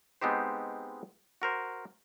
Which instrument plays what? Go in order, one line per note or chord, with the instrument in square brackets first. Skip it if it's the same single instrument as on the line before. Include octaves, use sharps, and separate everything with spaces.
[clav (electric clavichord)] G#3 B3 C4 D#4 G4 C5
F#4 A#4 C5